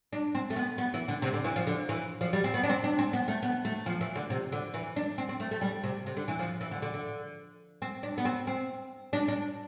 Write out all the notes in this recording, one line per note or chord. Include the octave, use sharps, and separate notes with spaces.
D4
C4
A3
B3
B3
E3
D3
C3
D3
E3
F3
D3
E3
F3
G3
C4
B3
D4
C4
D4
C4
B3
A3
B3
A3
F3
E3
D3
C3
D3
E3
D4
C4
C4
A3
A3
G3
C3
C3
D3
E3
F3
E3
D3
D3
D3
C4
D4
B3
C4
C4
D4
D4